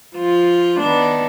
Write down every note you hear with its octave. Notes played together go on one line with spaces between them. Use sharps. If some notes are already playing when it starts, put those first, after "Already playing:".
F3 F4
D#3 B3 D4